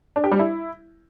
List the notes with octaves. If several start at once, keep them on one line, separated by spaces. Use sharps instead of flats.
D4
G4
G3
E4